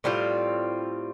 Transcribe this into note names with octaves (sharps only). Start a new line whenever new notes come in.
A2 G3 C4 F4